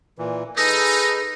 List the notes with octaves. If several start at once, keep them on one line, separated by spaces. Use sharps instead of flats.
A#2 E3
D#4 G#4 A4 B4 D#6 A#6